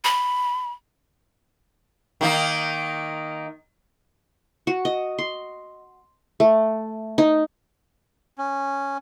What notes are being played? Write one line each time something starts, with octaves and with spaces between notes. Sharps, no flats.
B5
D#3 A#3 D#4
F#4
D#5
C6
A3
D#4
C#4